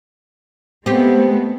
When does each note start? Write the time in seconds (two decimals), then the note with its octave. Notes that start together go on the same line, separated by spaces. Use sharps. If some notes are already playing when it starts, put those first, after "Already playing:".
0.86 G#3 A3 B3 C4 G4